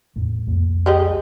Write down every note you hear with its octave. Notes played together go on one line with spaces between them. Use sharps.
E2 A2 A3
C2 F2 A#3
G#3 G4 D#5